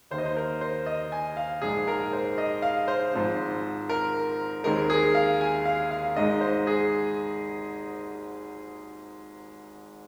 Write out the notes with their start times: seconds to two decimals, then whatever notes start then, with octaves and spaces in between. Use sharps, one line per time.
0.11 D#2 D#3 A#3 C5
0.18 D#5
0.26 C5
0.36 A#4
0.61 C5
0.86 D#5
1.12 G#5
1.37 F5
1.62 A#1 G#2 G#3 D#4 G#4
1.88 A#4
2.13 C5
2.38 D#5
2.62 F5
2.88 C5
3.13 G#1 G#2 F3 C4
3.89 A#4
4.64 D#2 D#3 G#3 C4 A#4
4.90 G#4
5.15 F5
5.41 G#5
5.65 F5
5.91 F5
6.15 G#1 G#2 G#3 D#4 D#5
6.41 C5
6.67 G#4